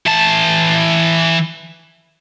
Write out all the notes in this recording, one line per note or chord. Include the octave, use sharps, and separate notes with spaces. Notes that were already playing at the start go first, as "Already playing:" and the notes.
E3 A5